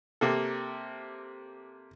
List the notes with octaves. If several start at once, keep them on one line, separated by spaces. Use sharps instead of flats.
C3 A#3 A4